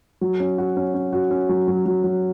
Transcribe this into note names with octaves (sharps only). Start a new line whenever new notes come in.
F#3
C#4
F#4
C#4
C#4
F#4
C#4
F#3
F#3
F#3
F#3